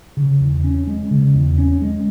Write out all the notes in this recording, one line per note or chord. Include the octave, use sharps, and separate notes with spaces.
C#3
E2
C#4
G#3
C#3
E2
C#4
G#3